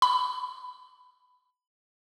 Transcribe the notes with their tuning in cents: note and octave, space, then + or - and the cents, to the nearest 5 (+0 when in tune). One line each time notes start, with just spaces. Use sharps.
B5 +15